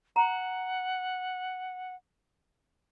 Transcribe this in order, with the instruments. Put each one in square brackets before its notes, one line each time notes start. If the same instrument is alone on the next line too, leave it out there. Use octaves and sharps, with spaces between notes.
[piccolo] F#5 [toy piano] A#5